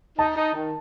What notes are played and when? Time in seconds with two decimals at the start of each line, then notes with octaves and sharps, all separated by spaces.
0.18 D#4 A5
0.36 D#4
0.54 D#3